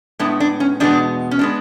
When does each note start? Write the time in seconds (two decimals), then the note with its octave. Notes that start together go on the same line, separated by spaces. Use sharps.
0.19 A2 G#3 B3 D4
0.40 D4
0.60 C#4
0.80 E2 B2 G#3 B3 D4
1.31 C#4
1.39 G#3 B3 D4